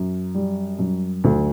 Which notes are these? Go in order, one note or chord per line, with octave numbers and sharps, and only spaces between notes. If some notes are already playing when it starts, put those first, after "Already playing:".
Already playing: F#2
G3
F#2
D2